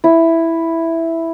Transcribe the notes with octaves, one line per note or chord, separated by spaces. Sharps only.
E4